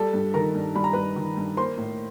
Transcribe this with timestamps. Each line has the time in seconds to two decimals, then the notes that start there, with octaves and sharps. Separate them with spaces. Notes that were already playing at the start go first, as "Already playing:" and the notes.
Already playing: G3 A4 A5
0.13 G2
0.34 D#3 A#4 A#5
0.55 G2
0.75 G3 B5
0.84 A#5
0.93 G2 B4 B5
1.16 D#3
1.37 G2
1.57 A#3 C5 C6
1.77 A2